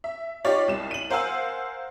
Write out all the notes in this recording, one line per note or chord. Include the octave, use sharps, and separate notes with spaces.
E5
D#4 F4 G4 C#5 D5
C2 E7
D#7 F#7
A#4 C5 F5 F#5 G#5 E6